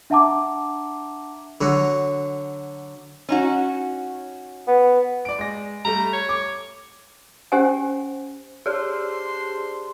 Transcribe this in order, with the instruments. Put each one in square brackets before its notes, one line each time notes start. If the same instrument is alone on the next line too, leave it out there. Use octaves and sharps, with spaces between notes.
[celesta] D4 E5 F#5 A5 A#5 D6
[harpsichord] D3 F#3
[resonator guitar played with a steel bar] C#4 D#4 F#4
[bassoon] B3
[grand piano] D5 D7
G#3 A#6
[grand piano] G3 A3 [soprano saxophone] A#5
[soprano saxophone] C#5
[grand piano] D6
[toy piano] C#4 G4 C5 F#5 G#5
[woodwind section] D4 C5 C6 [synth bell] G4 G#4